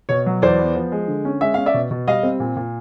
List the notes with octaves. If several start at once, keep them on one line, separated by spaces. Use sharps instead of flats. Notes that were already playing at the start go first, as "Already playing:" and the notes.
B2 C#5
F#3
E2 C5 D5
B3
F3
G#3
D3
C#4
G#3 E5
C#4 F5
D5 E5
B2
B2
G3 D#5 F5
C4
A#2
A#2